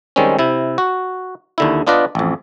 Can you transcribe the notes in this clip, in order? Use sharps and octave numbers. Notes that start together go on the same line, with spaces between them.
D#3 G3 G#3 C4 C#4
C3 E4
F#4
D#2 D3 E4
B3 D4 F4 B4 D5 D#5
A1 F2